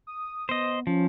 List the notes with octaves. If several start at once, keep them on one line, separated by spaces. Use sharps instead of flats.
D#6
B3 C5 D#5
F3 C#4